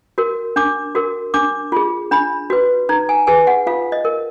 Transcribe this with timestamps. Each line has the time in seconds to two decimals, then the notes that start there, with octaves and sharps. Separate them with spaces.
0.18 F#4 A#4
0.56 D4 D6
0.95 F#4 A#4
1.34 D4 D6
1.72 F4 G#4
2.11 D4 B5
2.50 F#4 B4
2.89 D#4 A#5
3.09 G#5
3.27 G#4 B4 G#5
3.47 F#5
3.67 F4 F5
3.92 D#5
4.05 A#4